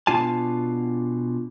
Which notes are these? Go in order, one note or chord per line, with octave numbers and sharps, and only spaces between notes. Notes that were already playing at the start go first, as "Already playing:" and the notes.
B2 D4 F4 G#5 A5